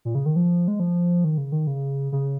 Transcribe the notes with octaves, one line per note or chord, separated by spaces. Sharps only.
A#2
C#3
D#3
F3
G#3
F3
D#3
C#3
D#3
C#3
C#3